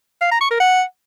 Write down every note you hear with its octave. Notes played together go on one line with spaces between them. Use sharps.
F5
A#5
C#6
A#4
F#5